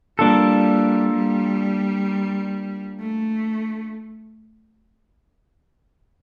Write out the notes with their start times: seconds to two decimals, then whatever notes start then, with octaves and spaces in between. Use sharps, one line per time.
0.19 G3 A#3 D4 F4 A4
1.13 G3
3.00 A3